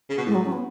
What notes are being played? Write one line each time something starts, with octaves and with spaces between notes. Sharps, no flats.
C#3
B2
A2 G#3
F#3
C#4
B3